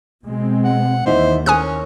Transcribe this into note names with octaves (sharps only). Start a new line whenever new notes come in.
B2 G#3 C4
F#5
D#2 E3 D#4 C5 E5
C#4 A#4 C#5 G#5 D#6 F#6